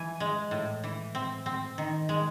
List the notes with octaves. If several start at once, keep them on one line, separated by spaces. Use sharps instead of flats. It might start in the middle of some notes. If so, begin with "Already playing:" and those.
Already playing: E3 G#5
G#3
A2
E3
C4
C4
D#3
G#3